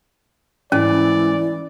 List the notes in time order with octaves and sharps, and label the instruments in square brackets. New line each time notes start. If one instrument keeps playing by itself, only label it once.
[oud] G#2 [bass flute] E3 [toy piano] C#4 [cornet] D5